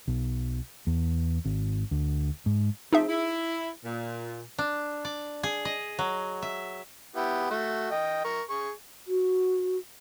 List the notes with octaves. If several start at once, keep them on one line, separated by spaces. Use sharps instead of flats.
B1
E2
G#1
D2
G#2
F3 A3 C4 D#4 G#4 E5
E4
A#2
D4
D5
G#4
D#5
F#3
E5
B3 E4 G4
A3 F#4
D#5 G5
A#4 C#6
G#4 C#6
F#4